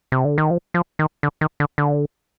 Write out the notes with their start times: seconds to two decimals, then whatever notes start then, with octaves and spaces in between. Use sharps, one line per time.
0.12 C3
0.25 D3
0.38 D#3
0.51 F3
0.74 F3
0.99 D#3
1.23 D3
1.41 D#3
1.60 D3
1.78 D3